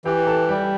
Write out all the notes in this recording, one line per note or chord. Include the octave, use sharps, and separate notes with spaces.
E3 G4 G5
A4 A5
G3 G4 G5